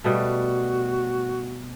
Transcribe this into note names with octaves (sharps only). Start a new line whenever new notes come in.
B2 G3 A3 F#4